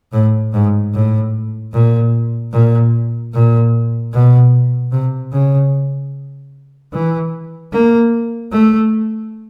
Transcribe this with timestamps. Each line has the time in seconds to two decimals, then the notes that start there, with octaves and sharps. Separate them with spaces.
0.13 A2
0.53 G#2
0.94 A2
1.73 A#2
2.52 A#2
3.33 A#2
4.13 B2
4.92 C3
5.32 C#3
6.93 E3
7.72 A#3
8.52 A3